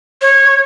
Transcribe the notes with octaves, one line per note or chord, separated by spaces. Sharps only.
C#5